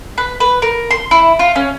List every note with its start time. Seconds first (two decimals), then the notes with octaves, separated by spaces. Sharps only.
0.18 B4
0.40 B4
0.62 A#4
0.91 C6
1.11 E4
1.39 F4
1.56 C#4